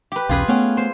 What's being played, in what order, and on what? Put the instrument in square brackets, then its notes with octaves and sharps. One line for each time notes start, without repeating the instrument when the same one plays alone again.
[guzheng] G4 B4
[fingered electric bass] B1 E2 C#4 [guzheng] F4 G#4 B4
[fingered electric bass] A3 [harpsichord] B3 C#4 G5
[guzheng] C5